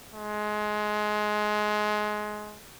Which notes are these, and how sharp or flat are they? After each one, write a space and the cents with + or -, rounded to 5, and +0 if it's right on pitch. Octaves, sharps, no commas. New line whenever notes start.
G#3 +20